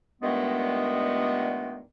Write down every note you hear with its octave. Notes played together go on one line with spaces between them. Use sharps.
G2 A#2 D#3 G#3 A3 B3